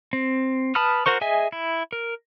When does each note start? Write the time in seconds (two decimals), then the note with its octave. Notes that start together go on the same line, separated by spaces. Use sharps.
0.13 C4
0.75 B4 A5 B5 D#6 F6
1.06 F#4 A#4 C5 C#6
1.21 G#4 D#5 E5 G#5
1.52 E4
1.92 A#4